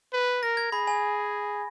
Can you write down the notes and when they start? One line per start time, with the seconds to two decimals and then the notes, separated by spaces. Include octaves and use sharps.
0.13 B4
0.43 A#4 A#6
0.57 G#6
0.72 G#4 B5
0.87 G#5